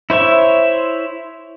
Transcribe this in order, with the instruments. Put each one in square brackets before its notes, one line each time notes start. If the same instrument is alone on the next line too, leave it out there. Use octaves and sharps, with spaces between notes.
[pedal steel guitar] E4 C5 C#5 E5